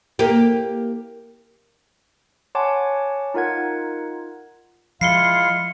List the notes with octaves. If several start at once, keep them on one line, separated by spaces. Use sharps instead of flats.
A#3 G4
C#5 F#5 G#5 A5 C6 D6
D#4 F4 A#4 F#5 G#6
F3 G#3 E4 F4 F5 C7 C#7 G7